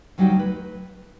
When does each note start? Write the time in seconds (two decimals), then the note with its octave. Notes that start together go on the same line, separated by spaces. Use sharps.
0.18 D2 F#3 G3 D#4 G5
0.39 B4